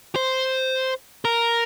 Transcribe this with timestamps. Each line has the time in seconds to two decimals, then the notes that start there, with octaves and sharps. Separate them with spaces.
0.16 C5
1.25 A#4